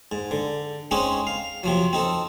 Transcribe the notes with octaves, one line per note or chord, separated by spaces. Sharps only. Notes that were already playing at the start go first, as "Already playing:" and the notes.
G#2
D3
G#3 C4 C#4 D#4
F5
C3 F3 F#3
C4 D#4 A4